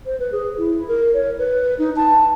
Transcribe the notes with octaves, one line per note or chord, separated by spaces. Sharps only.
C5
B4
G#4
E4
A#4
C#5
B4
D#4
A5